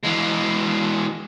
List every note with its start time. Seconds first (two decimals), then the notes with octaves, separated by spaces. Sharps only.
0.05 E3 G#3